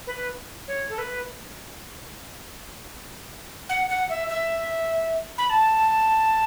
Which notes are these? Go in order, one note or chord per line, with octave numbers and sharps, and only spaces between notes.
B4
C#5
A4
B4
F#5
F#5
E5
E5
B5
A5